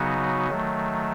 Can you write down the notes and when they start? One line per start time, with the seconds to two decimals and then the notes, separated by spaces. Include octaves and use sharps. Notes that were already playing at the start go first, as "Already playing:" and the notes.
Already playing: C#3 F#3 B3 D#4 F#4
0.49 D#3 F#3 A3